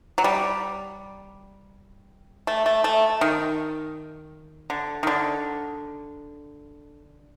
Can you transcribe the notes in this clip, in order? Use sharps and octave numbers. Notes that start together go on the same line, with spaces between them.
F#3
G3
A3
A3
A3
D#3
D3
D#3
D3